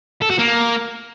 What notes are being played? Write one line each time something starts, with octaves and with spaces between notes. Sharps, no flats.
A4
F#4
A#3